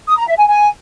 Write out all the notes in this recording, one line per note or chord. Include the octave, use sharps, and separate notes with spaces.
D#6
A#5
E5
G#5
G#5